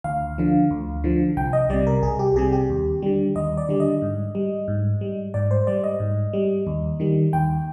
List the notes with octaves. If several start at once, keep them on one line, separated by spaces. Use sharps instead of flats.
D2 F5
D3 F3
D2
D3 F3
C2 G5
D#5
C3 G3 D5
A#4
C2 G#4
G4
C3 G3 G#4
G4
D#2
D3 G3
D#2 D#5
D5
D3 G3
D#5
G#2
G3
G#2
G3
G#2 D5
C5
G3 D5
D#5
G#2
G3
D#2
D#3 G3
D#2 G5